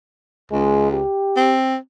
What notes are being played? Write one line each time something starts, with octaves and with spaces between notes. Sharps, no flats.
C#2 G#3
G4
C4